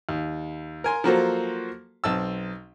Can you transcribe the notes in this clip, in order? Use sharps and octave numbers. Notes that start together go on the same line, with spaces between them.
D#2
A#4 G#5 C6
F3 F#3 A#3 F#4 A4 C5
B1 C4 A5 E6